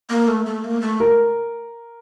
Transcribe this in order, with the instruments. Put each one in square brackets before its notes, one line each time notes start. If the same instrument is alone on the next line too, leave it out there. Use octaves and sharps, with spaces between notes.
[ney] A#3
A3
A3
A#3
A3
[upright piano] A#4